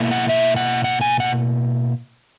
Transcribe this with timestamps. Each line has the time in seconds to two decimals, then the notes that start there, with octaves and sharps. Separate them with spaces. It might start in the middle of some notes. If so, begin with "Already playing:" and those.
Already playing: B2 A#3 E4
0.11 F#5
0.29 E5
0.56 F#5
0.84 F#5
1.01 G#5
1.20 F#5